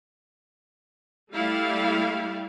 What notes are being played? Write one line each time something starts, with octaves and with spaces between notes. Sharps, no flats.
G3 A3 E4 F5